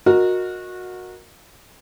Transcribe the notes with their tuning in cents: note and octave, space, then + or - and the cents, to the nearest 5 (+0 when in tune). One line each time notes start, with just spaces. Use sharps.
F#4 -20 A#4 +0 D#5 +0